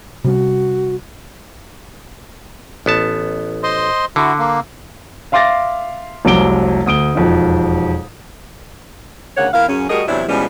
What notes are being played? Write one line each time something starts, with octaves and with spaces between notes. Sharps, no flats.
C3 G3 C#4 F#4
A1 B3 A5
C5 D#5 C6
D3 E4 F#4
A#3
E5 F5 C6 D6 A6 A#6
F1 C2 F#3 D6 D7 G7
D2 D#6 D7 G7
E1 F2 D#4
D2 G#2 C#3 A#3 C#5 F#5
E2 E4 A#4 F5
F#2 C#3 C#4
G3 A3 F#4 G#4 A#4 D#5
E2 C3 F#3 D4 E4
B2 E3 F3 G3 G#3 C#4